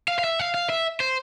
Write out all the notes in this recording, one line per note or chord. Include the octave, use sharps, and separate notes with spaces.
F5
F5
E5
F5
F5
E5
C5